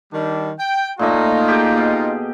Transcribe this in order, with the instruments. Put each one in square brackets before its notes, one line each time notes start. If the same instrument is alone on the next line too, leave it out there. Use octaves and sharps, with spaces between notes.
[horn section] D#3 G3 D4
G5
[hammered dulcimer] A#2 A3 D#5 [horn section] D#4 F4
[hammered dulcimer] G4 G#4 G5
B2